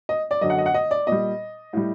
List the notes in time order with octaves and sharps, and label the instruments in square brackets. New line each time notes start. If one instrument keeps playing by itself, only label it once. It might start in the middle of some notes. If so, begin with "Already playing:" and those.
[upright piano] D#5
D5
F#2 D3 F#3 D#5
F#5
D#5
F#5
D#5
D5
A#2 G3 D#5
A2 G3